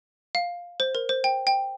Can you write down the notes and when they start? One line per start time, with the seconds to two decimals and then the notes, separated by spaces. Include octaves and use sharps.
0.35 F5
0.80 C5
0.95 A#4
1.09 C5
1.24 G5
1.47 G5